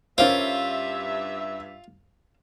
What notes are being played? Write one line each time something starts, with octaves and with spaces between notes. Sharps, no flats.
G2 C#4 F4 A#4 C5 D5 E5 F5